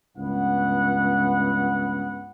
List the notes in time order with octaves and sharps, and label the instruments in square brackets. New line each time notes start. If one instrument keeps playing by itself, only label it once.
[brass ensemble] C#2 G2 B3 F#5